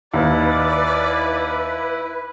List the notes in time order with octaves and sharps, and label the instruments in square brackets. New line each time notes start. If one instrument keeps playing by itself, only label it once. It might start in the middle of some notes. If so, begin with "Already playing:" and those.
[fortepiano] D#2 [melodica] E4 [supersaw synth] B4 [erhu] D5